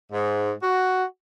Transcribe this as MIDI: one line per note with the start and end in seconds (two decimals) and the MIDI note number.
0.11 0.52 44
0.62 1.04 66